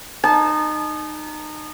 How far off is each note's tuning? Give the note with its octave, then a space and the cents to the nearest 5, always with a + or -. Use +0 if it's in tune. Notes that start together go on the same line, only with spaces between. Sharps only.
D#4 -25 A5 -40